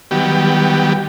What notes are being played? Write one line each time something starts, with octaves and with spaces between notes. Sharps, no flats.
D#3 F#3 G3 B3 G4